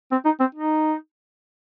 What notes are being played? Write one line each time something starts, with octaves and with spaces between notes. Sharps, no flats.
C4
D#4
C4
D#4